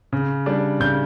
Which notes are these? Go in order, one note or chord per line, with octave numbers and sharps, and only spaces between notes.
C#3
G3 D4
C#3 G6